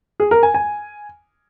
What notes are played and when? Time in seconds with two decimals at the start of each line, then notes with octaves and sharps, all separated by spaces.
0.20 G#4
0.31 A#4
0.43 G#5
0.54 G#5